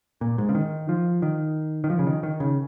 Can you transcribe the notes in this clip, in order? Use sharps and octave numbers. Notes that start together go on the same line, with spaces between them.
A#2
G#2
C#3
D#3
F3
D#3
D#3
F3
C#3
D#3
D#3
C#3